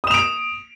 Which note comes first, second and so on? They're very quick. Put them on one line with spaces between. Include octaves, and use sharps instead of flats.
D#6 E7 F7 D7